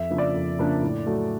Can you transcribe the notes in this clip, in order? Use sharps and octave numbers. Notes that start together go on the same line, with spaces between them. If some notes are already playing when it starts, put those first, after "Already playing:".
Already playing: F2 E5
C#3 F3 A#3 D4
D5
F2
C#3 F3 A#3 D4
A2
F#3 A3